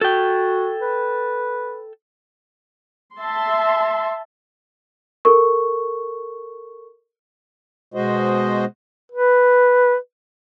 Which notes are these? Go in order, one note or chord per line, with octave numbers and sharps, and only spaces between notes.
F#4 A4 G5
B4
E5 A5 C6
A4 A#4 C#6
B2 G#3 F#4 C5 D#5
B4